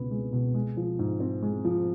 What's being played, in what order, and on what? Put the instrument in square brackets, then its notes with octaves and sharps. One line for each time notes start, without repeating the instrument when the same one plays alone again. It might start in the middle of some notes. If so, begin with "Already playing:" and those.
Already playing: [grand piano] C#2 B2 B3
G#3
B2
G#3
F3
G#2
C4
G#3
F3